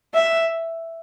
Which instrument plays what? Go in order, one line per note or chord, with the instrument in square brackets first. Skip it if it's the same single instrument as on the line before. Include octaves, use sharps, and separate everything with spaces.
[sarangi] E5